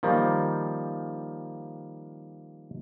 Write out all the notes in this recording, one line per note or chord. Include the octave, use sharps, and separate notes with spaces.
D#3 F3 G3 A#3